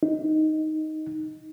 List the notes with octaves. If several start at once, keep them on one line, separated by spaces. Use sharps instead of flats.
D#4